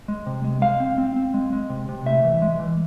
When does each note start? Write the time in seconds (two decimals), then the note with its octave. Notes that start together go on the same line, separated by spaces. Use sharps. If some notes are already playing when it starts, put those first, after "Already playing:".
0.08 G#3
0.26 C3
0.44 G#3
0.62 G#3 F5
0.80 C4
0.98 C4
1.16 C4
1.34 G#3
1.53 G#3
1.70 C3
1.89 C3
2.06 A2 E5
2.24 E3
2.42 G#3
2.60 E3